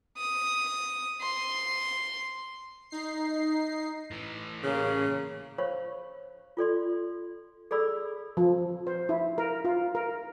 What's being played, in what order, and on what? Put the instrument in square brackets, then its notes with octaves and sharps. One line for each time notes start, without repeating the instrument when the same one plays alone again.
[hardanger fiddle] D#6
C6
[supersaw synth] D#4 C7
[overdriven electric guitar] A2 E3
[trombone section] A1 A#3 C#4 [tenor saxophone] C#3
[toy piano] C5 C#5 F5 B5 C#6
F4 A4 D5 C6
G#4 A4 D5 B5 E6
[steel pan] F3
C5
E4
A#4
F4
A#4